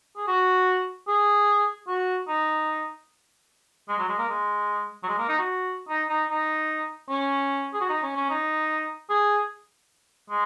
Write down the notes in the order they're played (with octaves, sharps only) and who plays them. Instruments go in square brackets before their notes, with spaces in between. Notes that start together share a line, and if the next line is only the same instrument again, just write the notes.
[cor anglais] G#4
F#4
G#4
F#4
D#4
G#3
F#3
G#3
A#3
G#3
F#3
G#3
A#3
D#4
F#4
D#4
D#4
D#4
C#4
G#4
F#4
D#4
C#4
C#4
D#4
G#4
G#3